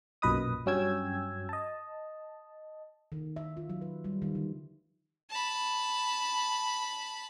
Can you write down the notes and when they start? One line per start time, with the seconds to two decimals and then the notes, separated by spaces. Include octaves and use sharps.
0.22 B1 F#2 A#2 B4 D#5 D#6
0.66 G2 F#3 C#4 G5 E6 G#6
1.49 D#5 A5
3.12 D#3
3.36 E5
3.57 F4
3.69 F#3
3.81 B4
4.04 G3
4.22 D#3
4.35 D3
5.30 A5 B5